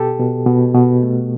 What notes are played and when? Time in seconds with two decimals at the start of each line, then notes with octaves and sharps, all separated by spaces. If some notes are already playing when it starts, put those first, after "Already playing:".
Already playing: B2 G4 A4
0.19 B2
0.46 B2
0.74 B2
1.03 A3